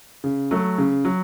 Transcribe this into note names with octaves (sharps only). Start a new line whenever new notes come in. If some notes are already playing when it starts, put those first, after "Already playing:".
C#3
F#3 A3
C#3
F#3